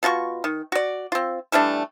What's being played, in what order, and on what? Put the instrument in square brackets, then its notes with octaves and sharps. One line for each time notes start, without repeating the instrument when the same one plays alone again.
[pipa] B2 F4 F#4 C#6
D#3
F#4 D5
C4 F4
E3 G3 A3 D4